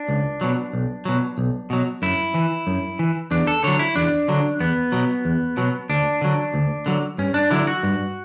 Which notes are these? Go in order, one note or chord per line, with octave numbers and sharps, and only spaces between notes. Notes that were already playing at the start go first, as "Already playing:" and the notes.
Already playing: D4
C#2
B2 F#3
B1
B2 F#3
B1
B2 F#3
F#2 E4
E3
F#2
E3
E2 D4
A4
D3 F#3 C#5
E4
E2 D4
D3 F#3
E2 B3
B2 F#3
E2
B2 F#3
D2 D4
D3 F#3
D2
D3 F#3
G2 C#4
D4
D3 F#3 E4
F#4
G2